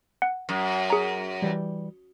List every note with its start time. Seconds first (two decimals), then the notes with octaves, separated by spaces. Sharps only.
0.22 F#5
0.49 F#2
0.90 G#4 A#5
1.42 E3 G3